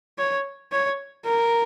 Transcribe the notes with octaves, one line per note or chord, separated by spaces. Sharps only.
C#5
C#5
A#4